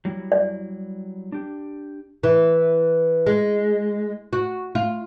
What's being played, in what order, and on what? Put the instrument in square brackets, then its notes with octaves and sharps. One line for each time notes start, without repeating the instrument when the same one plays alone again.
[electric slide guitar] F#3 G3 E4
[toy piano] D5
[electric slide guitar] D4 G4
[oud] E3
G#3
F#4
F4